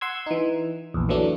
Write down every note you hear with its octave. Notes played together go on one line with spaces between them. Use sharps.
F#5 C6 E6 G#6
E3 D#4
A#1 E2
D3 E3 F#3 A3 D4